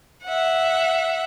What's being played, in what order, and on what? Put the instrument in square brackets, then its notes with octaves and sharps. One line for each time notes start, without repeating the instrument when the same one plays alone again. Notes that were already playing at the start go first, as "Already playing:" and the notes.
[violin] E5 F#5